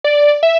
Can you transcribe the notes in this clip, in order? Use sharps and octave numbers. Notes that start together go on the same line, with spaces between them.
D5
E5